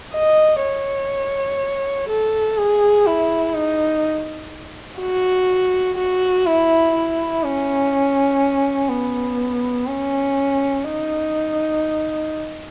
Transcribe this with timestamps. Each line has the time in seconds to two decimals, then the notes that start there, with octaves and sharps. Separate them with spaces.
0.14 D#5
0.63 C#5
2.09 A4
2.58 G#4
3.06 E4
3.56 D#4
5.00 F#4
5.98 F#4
6.46 E4
6.95 E4
7.43 C#4
8.89 B3
9.87 C#4
10.84 D#4